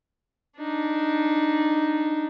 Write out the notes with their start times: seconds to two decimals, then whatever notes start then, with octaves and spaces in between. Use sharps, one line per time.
0.57 D4 D#4